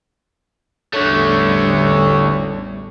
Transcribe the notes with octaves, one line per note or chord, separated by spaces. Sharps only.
A1 E2 D3 G3 A3 C#5